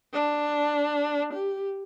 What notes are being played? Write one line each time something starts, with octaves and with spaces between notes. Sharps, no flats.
D4
G4